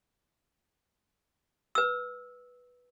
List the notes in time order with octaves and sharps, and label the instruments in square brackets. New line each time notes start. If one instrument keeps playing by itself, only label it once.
[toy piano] B4 E6